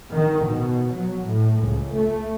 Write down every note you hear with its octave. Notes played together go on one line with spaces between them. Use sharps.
D#3
B2
F#3
A2
C#2
A3